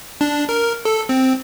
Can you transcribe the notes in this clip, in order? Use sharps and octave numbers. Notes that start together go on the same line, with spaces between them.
D4
A#4
A4
C4